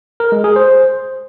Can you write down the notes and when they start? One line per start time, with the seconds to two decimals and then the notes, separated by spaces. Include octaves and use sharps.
0.20 A#4
0.32 G#3
0.44 G#4
0.56 C5